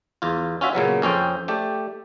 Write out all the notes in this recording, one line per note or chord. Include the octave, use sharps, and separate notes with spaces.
E2 F4
C#4 F4 F#4 E5
A#2 C#3 F#3 B3
F2 C#4 C5 G5
A3 G4 D5